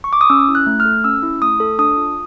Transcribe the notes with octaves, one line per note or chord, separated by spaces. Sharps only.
C#6
D6
D#6
C#4 E6
E4
F#6
A3
F6
A4
C#4 E6
E4
A3 D#6
A4
D4 D#6
F4